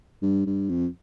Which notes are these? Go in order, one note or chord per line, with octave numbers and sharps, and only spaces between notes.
G2
G2
F2